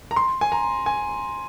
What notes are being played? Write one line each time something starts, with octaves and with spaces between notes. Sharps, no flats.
A#5
C6
G#5
A#5
G#5